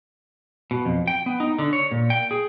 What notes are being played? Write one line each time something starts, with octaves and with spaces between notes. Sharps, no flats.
B2
F2
G5
B3
D#4
D3
C#5
A#2
G5
G#4